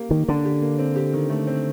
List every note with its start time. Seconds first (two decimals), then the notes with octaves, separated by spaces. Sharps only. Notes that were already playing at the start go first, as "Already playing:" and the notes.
Already playing: A#3 G4
0.10 D#3 A#3
0.28 D3 D4
0.45 G4
0.62 A#3
0.78 C4
0.96 G4
1.14 D#3
1.30 A3
1.47 C4